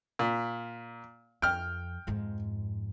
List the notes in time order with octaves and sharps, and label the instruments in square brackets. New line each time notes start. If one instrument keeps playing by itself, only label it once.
[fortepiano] A#2
[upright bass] F2 [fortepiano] G5 F6
[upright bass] F2 G#2